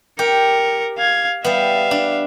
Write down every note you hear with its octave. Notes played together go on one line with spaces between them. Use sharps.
G4 A#4 C#7
F5 G#6
G3 B3 E5 F5
D4